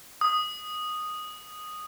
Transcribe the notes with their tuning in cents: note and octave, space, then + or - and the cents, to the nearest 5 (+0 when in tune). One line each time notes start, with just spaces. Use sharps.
D#6 -5